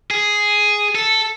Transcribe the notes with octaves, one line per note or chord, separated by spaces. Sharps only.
G#4
A4